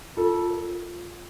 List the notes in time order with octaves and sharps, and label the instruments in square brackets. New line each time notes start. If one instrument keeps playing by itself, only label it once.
[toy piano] F4 [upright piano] A4
[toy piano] A#4